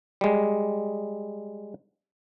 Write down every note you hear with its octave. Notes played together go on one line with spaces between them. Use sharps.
G3 G#3